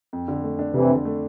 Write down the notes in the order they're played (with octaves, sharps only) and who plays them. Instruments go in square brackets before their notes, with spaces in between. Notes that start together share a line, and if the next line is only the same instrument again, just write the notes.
[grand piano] F2
D3
A3
D4
[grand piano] F2 [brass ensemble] C3 E3
[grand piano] D3
A3